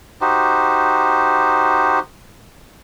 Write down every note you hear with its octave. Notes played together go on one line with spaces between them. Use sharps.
D#4 F#4 G4 C5